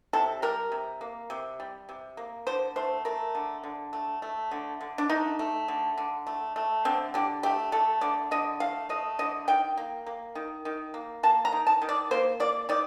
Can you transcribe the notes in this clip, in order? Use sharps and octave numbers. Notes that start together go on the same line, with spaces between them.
C3 A4
G3 A#4
C3
A#3
C3
G3
C3
A#3
D3 C5
A3 C5
A3 A#4
D3
D3
A3
A3
D3
D3
D4
A3 D#4
A3
D3
D3
A3
A3
D3 C4
D3 G4
A3 G4
A3 A4
D3 D5
D3 D#5
A3 F5
A3 D#5
D3 D#5
D#3 G5
A#3
A#3
D#3
D#3
A#3
A#3 A5
A#5
D#3
A5
D#3
D5
A#3 C5
A#3 D5
D#3 D5